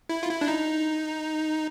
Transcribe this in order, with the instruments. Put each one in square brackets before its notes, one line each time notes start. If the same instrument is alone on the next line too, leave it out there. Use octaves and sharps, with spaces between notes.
[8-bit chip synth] E4
F4
E4
D4
D#4